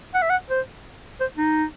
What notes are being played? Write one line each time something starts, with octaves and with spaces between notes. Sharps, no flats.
F#5
E5
F#5
C5
C5
D#4